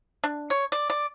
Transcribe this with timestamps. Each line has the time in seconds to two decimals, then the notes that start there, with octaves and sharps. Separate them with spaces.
0.24 D4
0.50 C#5
0.72 D5
0.90 D5